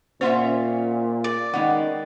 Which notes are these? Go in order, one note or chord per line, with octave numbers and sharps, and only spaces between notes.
A#2 C#4 F4 C5 E5 F#5 C6
D5
D#3 G#3 B3 C#4 F#5